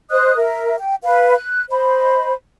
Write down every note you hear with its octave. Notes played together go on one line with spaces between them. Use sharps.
C5 D#5 D#6 F#6
A#4 E5
G5
B4 F5
F#6
C5 D#5 B5